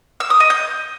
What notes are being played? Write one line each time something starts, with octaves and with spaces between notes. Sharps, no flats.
E6
D#6
D#5
G6